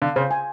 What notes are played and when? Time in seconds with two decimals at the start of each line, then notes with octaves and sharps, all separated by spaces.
0.02 D3 F5
0.16 C#3 C5
0.31 G#5